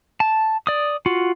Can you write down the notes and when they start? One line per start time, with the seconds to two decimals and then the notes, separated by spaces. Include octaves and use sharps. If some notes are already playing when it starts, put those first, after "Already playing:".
0.20 A5
0.67 D5 D#6
1.06 F4 F#4